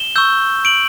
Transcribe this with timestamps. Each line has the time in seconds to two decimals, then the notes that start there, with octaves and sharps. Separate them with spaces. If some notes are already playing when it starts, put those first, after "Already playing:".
Already playing: E7 G7
0.16 C#6 E6 G6
0.65 D7 F#7